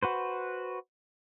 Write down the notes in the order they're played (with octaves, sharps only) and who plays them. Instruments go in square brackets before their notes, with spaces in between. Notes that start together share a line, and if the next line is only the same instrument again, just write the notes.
[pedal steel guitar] F#4 B4 C5